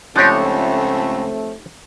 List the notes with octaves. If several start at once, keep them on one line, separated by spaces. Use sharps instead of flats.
C#2 F3 A3 C4 D4 D#4 G4 C#5